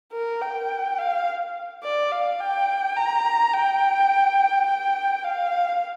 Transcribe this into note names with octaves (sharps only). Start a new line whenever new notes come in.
A#4
G5
F5
D5
F5
G5
A#5
G5
G5
F5